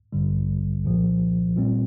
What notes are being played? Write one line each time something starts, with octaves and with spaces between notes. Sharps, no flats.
A1 G2 D3 G3
C2 A#2 F3
A#2 G3 C4